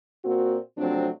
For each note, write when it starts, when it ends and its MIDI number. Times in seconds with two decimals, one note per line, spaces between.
0.24 0.57 46
0.24 0.57 58
0.24 0.57 60
0.24 0.57 66
0.77 1.08 48
0.77 1.08 53
0.77 1.08 54
0.77 1.08 57
0.77 1.08 60
0.77 1.08 62